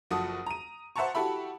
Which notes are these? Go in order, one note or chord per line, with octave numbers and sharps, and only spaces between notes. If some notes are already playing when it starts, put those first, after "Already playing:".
F#1 F3 F#4 A4 D#6
A#5 D#7
C5 E5 F#5 A5 A#5 C#6
E4 F#4 G4 A4 E5 B5